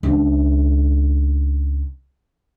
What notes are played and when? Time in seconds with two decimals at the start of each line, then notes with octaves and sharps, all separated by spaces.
0.03 C#2 D4